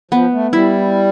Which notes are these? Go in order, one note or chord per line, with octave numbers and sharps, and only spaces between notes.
F3 B3
A3
G3 E4